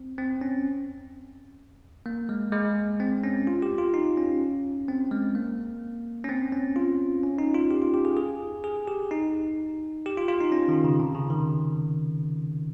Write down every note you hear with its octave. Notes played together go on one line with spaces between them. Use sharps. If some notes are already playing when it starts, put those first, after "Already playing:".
Already playing: C4
C4
C#4
A#3
G#3
G#3
C4
C#4
F4
G4
F4
D#4
C#4
C4
G#3
A#3
C#4
C4
C#4
F4
C#4
D#4
F4
G4
F4
G4
G#4
G#4
G#4
G4
D#4
G4
F4
F4
D#4
C#4
D#3
C#3
C3
C#3
D#3